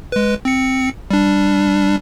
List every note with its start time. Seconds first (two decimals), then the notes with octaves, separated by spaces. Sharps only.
0.12 G#3 B4
0.45 C4 C#7
1.11 G3 D4